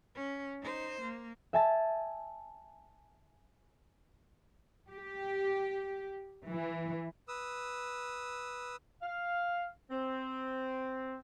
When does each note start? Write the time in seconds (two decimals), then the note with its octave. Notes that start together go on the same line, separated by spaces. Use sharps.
0.15 C#4
0.62 D#4 C5
1.01 A#3
1.53 E5 G#5 A5
4.90 G4
6.46 E3
7.28 B4 D#6 E6
9.02 F5
9.91 C4